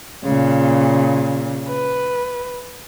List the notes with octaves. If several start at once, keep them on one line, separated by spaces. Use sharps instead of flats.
A#2 C#3
B4